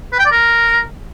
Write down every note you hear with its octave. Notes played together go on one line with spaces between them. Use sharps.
B4
G5
D5
A#4